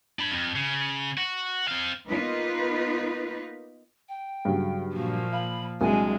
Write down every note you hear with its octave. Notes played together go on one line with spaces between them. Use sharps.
D4 B5
F2
C#3
F#4
C4 F5
A#3 B3 D#4 F4 B4
G5
G2 C#3 F#3
A#2 F3 A#3 F#4
F5 B5
C2 C3 F#3 G#3 D4 G#5